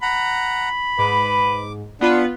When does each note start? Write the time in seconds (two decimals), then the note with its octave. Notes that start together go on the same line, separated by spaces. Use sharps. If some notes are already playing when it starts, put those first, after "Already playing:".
0.02 F#5 A#5 B5
0.99 G#2 B4 D6
2.01 B3 D4 F4 B4 F#5